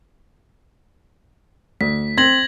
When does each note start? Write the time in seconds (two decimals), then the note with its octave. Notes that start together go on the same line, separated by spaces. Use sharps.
1.81 D2 B6
2.18 C4 G#6 A#6 F#7